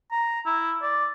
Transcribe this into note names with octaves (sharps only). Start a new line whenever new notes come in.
A#5
E4
D5